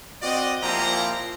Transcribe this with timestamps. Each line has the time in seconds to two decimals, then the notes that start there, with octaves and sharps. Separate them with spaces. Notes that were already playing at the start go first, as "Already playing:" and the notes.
0.22 C4 F#4 D5 D#5
0.61 A#2 F3 C4 E4 G4 A#5